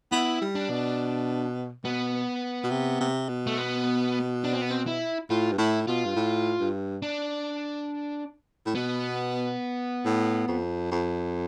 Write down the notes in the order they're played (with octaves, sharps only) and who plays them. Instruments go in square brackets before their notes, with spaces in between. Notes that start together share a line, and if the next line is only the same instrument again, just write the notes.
[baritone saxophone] B3 [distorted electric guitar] E4
[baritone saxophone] G3
[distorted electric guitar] D4
[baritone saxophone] B2
[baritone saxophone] B2 [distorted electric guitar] B3
[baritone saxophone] B2
C3
C3
B2
[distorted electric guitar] A3
B3
D4
C4
B3
C4
E4
[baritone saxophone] A2 [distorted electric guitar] F4
[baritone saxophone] G2
[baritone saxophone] A2 [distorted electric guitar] E4
[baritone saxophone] B2 [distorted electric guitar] F4
[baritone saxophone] G2
A2
G2
[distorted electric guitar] D4
[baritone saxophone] A2
[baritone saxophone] B2 [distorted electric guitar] B3
[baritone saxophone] A2
F2
F2